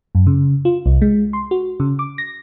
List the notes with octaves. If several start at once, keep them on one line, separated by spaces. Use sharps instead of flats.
F#2
C#3
F4
C2
G#3
C6
F#4
C#3
D6
A#6